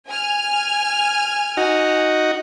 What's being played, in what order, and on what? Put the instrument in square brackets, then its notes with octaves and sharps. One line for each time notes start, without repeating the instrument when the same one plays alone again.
[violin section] G#5 F6
[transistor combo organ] D#4 F#4